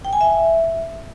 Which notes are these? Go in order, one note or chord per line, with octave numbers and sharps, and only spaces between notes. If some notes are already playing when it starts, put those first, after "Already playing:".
G5
G#5
E5